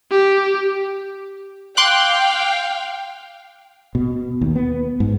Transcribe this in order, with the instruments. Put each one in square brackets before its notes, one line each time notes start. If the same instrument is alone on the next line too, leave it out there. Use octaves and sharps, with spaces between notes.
[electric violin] G4
[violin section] F5 G5 [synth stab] C6 D6 F#6
[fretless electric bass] B2
D#2
B3
G#2